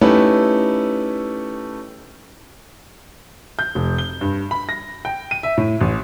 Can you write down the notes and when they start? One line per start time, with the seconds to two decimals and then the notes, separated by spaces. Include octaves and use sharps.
0.01 A3 C#4 D#4 E4 G4 B4
3.59 G6
3.75 F1
3.98 G7
4.21 G2
4.51 B5
4.69 A#6
5.05 G5
5.31 D#7
5.43 E5
5.58 A2
5.81 A1